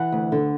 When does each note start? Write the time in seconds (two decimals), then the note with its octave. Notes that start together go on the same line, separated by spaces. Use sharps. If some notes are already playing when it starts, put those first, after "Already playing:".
Already playing: E3 F#5
0.12 D2
0.32 D3